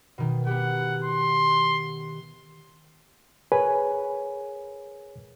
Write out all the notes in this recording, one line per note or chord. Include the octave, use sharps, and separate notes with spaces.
B2 D#3
B3 G4 F#5
C6
G#4 A#4 B4 C#5 G#5